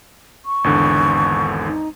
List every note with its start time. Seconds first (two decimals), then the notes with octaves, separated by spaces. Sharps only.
0.45 C#6
0.64 G#1 E2 D3
1.66 D#4